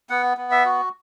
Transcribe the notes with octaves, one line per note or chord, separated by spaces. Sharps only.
B3 F#5
B3
E5
F#4